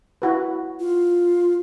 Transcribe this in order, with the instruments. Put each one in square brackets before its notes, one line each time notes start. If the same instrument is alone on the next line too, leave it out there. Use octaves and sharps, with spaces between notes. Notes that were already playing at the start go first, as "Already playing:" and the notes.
[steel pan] E4 F#4 B4
[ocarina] F4